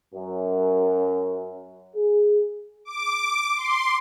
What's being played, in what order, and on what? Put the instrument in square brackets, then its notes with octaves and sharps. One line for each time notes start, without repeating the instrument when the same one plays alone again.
[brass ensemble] F#2
G#4
[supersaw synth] D6
C6